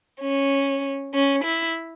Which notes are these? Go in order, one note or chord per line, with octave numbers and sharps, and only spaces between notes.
C#4
C#4
E4